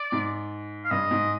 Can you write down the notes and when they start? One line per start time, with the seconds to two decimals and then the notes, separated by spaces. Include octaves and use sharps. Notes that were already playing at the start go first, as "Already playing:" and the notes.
Already playing: D5
0.12 G#2
0.84 F5
0.91 G2 D#5
1.11 G#2